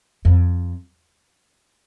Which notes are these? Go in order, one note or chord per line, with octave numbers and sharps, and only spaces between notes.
F2